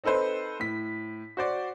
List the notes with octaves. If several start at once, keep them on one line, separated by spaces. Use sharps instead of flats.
C4 D#4 A4 B4 C5
A2 B6
F#4 C5 D5